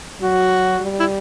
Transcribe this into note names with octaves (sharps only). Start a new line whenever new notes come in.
F#3 F#4
G3
E4